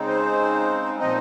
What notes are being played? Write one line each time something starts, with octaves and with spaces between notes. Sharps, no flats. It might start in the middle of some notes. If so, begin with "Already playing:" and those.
Already playing: C#3 G#3 C4 D#4
C5
A#2 F3 C4 D#4 D#5